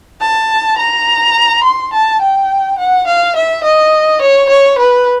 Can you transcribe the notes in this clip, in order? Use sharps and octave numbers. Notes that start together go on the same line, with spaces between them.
A5
A#5
C6
A5
G5
F#5
F5
E5
D#5
C#5
C#5
B4